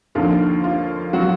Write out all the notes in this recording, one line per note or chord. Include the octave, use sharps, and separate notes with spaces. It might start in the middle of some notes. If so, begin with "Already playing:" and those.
D#2 D3 F3 F4
F4
F#3 F#4